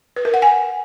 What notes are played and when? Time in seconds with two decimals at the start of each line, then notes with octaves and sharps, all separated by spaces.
0.16 B4
0.25 A#4
0.34 F#5
0.42 G#5